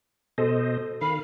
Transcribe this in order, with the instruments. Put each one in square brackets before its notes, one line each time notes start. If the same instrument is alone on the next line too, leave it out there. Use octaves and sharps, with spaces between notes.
[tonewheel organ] B2 C5 D#5 [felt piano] A4
[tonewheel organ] D#3 F5 [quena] B5